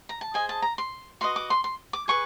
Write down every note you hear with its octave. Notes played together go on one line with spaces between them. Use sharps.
A#5
A5
G#4 C5 D#5 G#5
A5
A#5
C6
F#4 B4 D#5 C6
D6
C6
C6
D6
G#4 B4 C#6